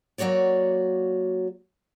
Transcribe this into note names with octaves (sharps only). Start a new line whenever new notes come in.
F#3 A#3 F#4 C#5 D5